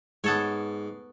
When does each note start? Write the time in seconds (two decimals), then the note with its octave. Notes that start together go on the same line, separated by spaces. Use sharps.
0.24 G#2 B3 A4 C#5